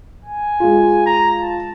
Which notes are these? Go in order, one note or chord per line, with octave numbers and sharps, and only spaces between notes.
G#5
G#3 F4
A#5
A5